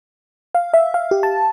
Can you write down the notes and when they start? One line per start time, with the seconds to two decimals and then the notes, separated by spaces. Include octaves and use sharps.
0.55 F5
0.74 E5
0.94 F5
1.11 G4
1.23 A5